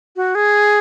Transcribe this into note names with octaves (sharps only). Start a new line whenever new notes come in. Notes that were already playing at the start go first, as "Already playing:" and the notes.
F#4
G#4